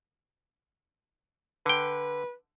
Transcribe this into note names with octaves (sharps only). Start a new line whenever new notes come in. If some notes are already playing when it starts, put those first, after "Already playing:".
D3 B4 G5